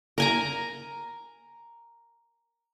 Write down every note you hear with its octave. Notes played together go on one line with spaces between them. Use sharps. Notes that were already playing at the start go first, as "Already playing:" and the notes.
A#4 G#5 A#5